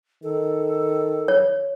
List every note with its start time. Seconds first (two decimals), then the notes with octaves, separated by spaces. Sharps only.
0.23 D#3 A4
1.28 C#5